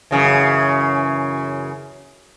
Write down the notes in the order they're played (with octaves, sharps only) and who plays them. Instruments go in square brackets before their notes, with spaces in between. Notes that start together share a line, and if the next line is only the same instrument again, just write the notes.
[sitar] F#2 C#3 E3